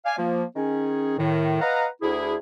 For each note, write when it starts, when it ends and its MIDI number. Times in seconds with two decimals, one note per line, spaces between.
0.05 0.16 74
0.05 0.16 77
0.05 0.16 80
0.17 0.43 53
0.17 0.43 58
0.55 1.18 51
0.55 1.18 61
0.55 1.18 68
1.18 1.57 45
1.18 1.57 51
1.61 1.86 71
1.61 1.86 75
1.61 1.86 77
1.61 1.86 78
1.61 1.86 82
2.02 2.35 38
2.02 2.35 64
2.02 2.35 68